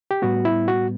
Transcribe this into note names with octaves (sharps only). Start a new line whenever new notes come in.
G4
A2 G3 B3 F#4
E4
F#4